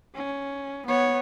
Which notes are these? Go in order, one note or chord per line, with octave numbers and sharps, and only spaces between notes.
C#4
B3 C#5